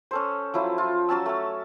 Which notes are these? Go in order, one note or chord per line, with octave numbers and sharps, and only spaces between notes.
C#4 A4 C5
F3 F#3 E4 F4
F4
F#3 C#4 A5 E6
A3 A5